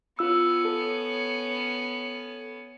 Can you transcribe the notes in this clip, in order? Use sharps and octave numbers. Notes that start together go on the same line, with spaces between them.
B3 C#4 F4 E6
A4